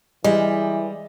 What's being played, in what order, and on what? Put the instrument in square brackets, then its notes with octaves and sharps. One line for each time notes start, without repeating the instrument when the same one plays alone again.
[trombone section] E3 [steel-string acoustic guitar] G3 [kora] G#3 [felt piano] D#5